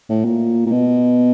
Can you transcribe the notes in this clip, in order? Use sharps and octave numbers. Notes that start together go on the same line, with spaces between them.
A2
A#2
A#2
B2